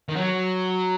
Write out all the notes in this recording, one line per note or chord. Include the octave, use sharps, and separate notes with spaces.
D#3
F#3